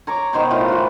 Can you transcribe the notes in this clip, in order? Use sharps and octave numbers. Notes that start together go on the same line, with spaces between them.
C#5 A#5 C#6 D6
B2 D#3 C5 C#6
A2 F4
E3 F#4